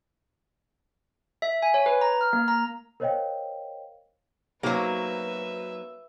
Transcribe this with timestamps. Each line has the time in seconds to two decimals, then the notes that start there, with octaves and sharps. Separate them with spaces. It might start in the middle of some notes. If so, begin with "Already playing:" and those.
1.42 E5
1.62 G#5
1.74 C#5
1.86 B4
2.01 A#5
2.21 F6
2.33 A#3
2.48 A#5
3.00 A#4 C5 C#5 D#5 F5 G5
4.63 F#3 A#3 D#4 F#4 B4 C5 E5